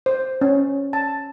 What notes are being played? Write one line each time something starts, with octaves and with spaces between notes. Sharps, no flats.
C5
C#4
A5